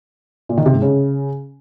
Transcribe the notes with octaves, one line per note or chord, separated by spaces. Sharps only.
A#2
D#3
C3
G#2
C#3